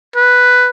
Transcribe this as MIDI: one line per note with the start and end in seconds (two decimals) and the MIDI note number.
0.16 0.70 71